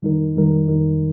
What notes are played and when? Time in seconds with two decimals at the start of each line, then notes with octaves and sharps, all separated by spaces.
0.02 F2 D#3 G3 D#4 A#4
0.35 F2 D#3 G3 D#4 A#4
0.67 F2 D#3 G3 D#4 A#4